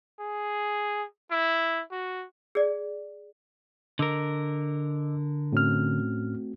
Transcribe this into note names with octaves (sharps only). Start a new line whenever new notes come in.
G#4
E4
F#4
G#4 D5
D3 A#4 D#5 D6 E6
A2 A3 C4 C#4 F#4 F6